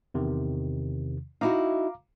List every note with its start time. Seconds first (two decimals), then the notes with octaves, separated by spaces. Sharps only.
0.14 E2 C3 D#3
1.41 D#4 E4 F#4 F5 A#5 D6